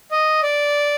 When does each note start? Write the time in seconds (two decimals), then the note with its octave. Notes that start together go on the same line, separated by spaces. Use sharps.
0.11 D#5
0.43 D5